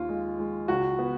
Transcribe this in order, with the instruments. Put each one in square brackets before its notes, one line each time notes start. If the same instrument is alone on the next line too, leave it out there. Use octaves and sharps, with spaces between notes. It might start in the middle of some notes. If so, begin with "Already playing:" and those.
Already playing: [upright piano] D#2 D#3 F4
G#3
G#3
C#2 F#4
B3